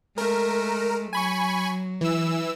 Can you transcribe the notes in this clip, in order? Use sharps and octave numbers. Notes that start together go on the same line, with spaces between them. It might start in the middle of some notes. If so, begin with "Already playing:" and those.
G#3 A3 A#4
F#3 G#5 B5 C#6
E3 E6